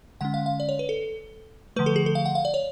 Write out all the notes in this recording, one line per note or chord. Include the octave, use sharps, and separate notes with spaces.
D3 G#3 C#4 F#5
F5
F5
D5
C#5
B4
A4
D3 F3 A3 B4
A4
G#4
A4
F5
F#5
F5
D5
C#5